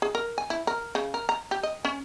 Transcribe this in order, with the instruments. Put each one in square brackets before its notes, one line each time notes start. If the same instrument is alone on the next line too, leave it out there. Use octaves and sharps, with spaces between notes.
[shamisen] G#4
A#4
G#5
E4
A#4
C#3
A#4
A#5
G4
D#5
C#4